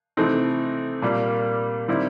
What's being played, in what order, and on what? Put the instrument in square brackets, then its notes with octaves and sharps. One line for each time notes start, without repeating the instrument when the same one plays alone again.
[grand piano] C3 E3 A3 C4 D#4
A#2 G3 A#3
D#3 G3 C4 E4